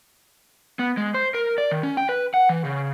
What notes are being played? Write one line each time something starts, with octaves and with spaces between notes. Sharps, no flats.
B3
G#3
C5
A#4
D5
D#3
C#4
G5
B4
F#5
E3
C#3